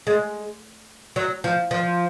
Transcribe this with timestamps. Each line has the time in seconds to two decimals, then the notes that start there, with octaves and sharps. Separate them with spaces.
0.07 G#3
1.16 F#3
1.44 F3
1.71 F3